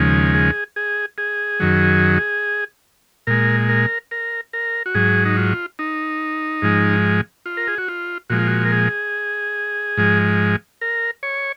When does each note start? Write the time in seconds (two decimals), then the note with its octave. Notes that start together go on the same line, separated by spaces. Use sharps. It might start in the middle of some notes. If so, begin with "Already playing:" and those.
Already playing: D#2 C#3 F3 G#3
0.35 G#4
0.76 G#4
1.18 G#4
1.60 F#2 D#3 F#3
3.27 A#2 G#3 A#4
3.69 A#4
4.11 A#4
4.53 A#4
4.86 F#4
4.95 G#2 F#3 G#4
5.25 D#4
5.37 F4
5.79 D#4
6.62 G#2 F3 G#3
7.46 F4
7.57 A#4
7.68 G#4
7.78 F#4
7.88 F4
8.30 A#2 F3 G#3 F#4
8.39 F4
8.47 F#4
8.65 A#4
8.72 G#4
9.97 G#2 F3 G#3
10.81 A#4
11.23 C#5